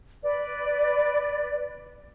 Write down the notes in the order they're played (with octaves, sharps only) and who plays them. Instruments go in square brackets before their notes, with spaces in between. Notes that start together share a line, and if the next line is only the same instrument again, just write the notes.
[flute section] B4 D5